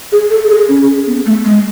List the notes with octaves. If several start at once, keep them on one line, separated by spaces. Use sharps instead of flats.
G#4
A4
G#4
C#4
B3
A3
G#3